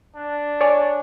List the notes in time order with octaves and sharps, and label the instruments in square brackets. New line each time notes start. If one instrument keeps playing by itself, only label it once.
[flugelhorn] D4
[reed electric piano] C#5 D5 G#5